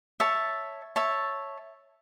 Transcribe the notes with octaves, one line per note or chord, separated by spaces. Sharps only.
C#5 E5 A5
C#5 E5 A5